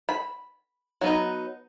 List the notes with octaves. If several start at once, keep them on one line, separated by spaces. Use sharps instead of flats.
B5
F#3 B3 D#4